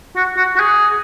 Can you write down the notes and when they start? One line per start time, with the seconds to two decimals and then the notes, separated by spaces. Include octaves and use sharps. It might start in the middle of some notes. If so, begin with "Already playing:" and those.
0.16 F#4
0.37 F#4
0.56 F#4
0.60 G#4